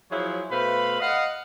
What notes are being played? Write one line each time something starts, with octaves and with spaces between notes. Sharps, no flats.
F3 F#3 E4 G#4 C5 C#5
B2 A3 B4 C5 F5 B5
D#5 F5 F#5